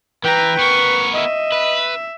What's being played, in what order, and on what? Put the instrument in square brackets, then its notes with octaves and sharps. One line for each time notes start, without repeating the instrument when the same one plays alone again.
[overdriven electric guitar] E3 [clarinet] B4 [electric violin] G5 A#5
[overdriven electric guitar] B3 A#4 [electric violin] C#6
[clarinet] D#5 [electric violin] E5
[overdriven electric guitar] B4